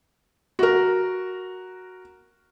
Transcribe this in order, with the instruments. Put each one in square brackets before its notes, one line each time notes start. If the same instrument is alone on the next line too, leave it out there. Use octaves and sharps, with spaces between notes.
[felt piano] F#4 A#4